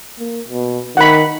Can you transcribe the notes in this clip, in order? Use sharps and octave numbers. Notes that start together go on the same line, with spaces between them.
A#3
B2
D#3 F#5 B5